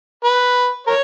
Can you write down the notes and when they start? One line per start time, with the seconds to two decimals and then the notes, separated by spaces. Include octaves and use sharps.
0.25 B4
0.87 A#4 C#5